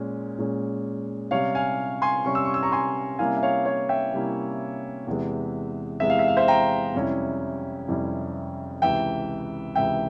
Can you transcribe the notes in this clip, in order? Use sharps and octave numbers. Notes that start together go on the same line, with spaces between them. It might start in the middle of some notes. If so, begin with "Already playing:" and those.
Already playing: A#2 G#3 C#4
A#2 G#3 C#4
C3 G3 C#4 C#5 F5
F5 G#5
G#5 C6
C3 G3 C#4 C#6
E6
C#6
E6
A#5 C#6
G#5 C6
C3 G3 A#3 C#4 E4 F5 G#5
E5
C#5 F5
C#5 F5
E5 G5
C3 G3 A#3 C#4 E4
E2 C3 E3 G#3
E2 C3 E3 G#3 E5
F5
E5
F5
C5 E5
G5 A#5
F2 C3 G3 C#4 E4
F2 C3 G3 C#4 E4
C#2 C3 E3 E5 G5
C#2 C3 E3 E5 G5